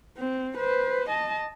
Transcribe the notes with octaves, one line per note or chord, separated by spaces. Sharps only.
C4
B4 C5
D#5 A5